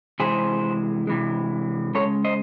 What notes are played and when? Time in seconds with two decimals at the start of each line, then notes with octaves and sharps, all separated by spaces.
0.20 C3 E3 G#3 G#4 C5
1.07 C3 E3 G#3
1.94 C#3 G#3 A4 C#5
2.24 C5 D#5